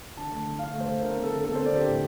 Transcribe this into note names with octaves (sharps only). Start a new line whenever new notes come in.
D3 A5
A3
D3
D3 F5
A3
C5
A3
D3 A#4
C4
A4
D3
C4 A4
C4 C5
D5
D3 G4
A2